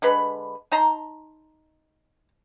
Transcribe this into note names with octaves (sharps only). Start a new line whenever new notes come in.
D3 G#3 B4 B5
D#4 A5 A#5 C6